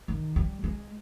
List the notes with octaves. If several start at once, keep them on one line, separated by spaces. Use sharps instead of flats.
D#3
G3
G#3